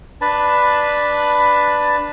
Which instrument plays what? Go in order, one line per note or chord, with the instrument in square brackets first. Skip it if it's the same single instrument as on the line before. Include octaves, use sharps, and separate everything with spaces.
[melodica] D4 B4 A5